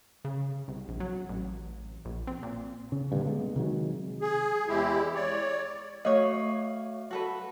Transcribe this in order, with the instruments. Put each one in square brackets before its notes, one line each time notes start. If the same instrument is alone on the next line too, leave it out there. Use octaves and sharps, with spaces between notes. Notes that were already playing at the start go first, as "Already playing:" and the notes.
[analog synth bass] C#3
C2
A#1
F#3
A1
A#1
C4
A#2
[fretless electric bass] C#3
G2 A#2 D3
G#3 B3
C3 D#3 F#3 G#3
[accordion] G#4
E2 G#3 C4 E4 G4
C#5 D5
[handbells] A3 F#4 F5 [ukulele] C#5 D#5
[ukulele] F#4 A4 B4